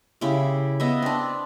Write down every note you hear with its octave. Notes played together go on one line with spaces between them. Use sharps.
C#3 E4 G4
B3 D#5 E5
C4 D4